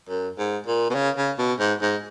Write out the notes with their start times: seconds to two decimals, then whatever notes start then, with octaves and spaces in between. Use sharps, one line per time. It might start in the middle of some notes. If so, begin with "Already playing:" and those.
0.09 F#2
0.38 G#2
0.67 A#2
0.90 B2
0.95 C#3
1.17 C#3
1.38 B2
1.59 G#2
1.82 G#2